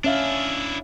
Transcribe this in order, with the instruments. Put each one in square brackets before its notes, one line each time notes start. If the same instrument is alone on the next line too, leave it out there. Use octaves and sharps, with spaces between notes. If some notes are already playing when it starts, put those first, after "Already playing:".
[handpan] C#4 E5 F5 [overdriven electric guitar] D4 E4